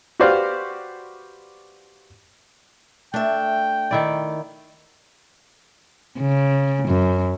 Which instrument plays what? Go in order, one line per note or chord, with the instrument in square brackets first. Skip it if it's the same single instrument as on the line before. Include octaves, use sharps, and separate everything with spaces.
[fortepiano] F#4 G4 B4 C5 D5 F5
[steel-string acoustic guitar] A3 E5 [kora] D4 [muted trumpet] G5
[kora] D#3 E4 D5
[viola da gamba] C#3
F#2